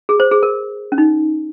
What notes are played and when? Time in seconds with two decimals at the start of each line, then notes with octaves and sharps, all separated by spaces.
0.09 G#4
0.20 C5
0.31 G#4
0.43 A#4
0.92 C#4
0.98 D#4